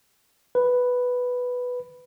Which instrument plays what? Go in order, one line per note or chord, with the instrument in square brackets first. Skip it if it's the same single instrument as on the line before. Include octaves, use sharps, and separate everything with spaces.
[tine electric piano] B4